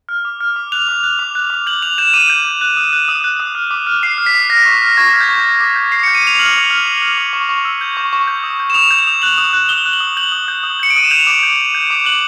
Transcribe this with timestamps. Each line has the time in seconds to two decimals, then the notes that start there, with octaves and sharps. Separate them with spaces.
0.09 F6
0.25 D6
0.41 F6
0.56 D6
0.72 F#6 F7
0.88 D6
1.03 F#6
1.19 D6
1.35 F#6
1.50 D6
1.67 G6 F#7
1.82 D6 F7
1.98 G6 E7
2.14 D6 D#7
2.30 G6
2.45 D6
2.61 F#6
2.77 D#6
2.93 F#6
3.08 D#6
3.24 F#6
3.40 D#6
3.55 F6
3.71 D6
3.87 F6
4.03 D6 C7
4.18 F6
4.26 B6
4.35 D6
4.50 F6 A#6
4.65 C#6
4.81 F6
4.97 C#6 G#6
5.14 F6
5.21 G6
5.29 C#6
5.44 G6
5.60 D6
5.76 G6
5.91 D6 C7
6.03 C#7
6.08 G6
6.15 D#7
6.24 D6 F7
6.39 F6 F#7
6.55 D6
6.71 F6
6.86 D6
7.02 F6
7.18 D6
7.33 C#6
7.49 C#6
7.65 E6
7.81 G6
7.97 C#6
8.13 C#6
8.27 G6
8.44 D#6
8.60 G6
8.70 E7
8.74 D#6 F7
8.91 G6
8.99 F7
9.07 D#6
9.22 F#6 F#7
9.38 D#6
9.53 F#6
9.69 D#6 G7
9.85 F#6
9.93 F#7
10.00 D#6
10.17 G6 F#7
10.32 D#6
10.48 G6
10.63 D#6
10.80 G6 C#7
10.90 D7
10.96 D#6 D#7
11.04 E7
11.11 G6 F7
11.27 D6
11.43 G6
11.59 D6
11.75 G6
11.90 D6
12.05 F#6 F#7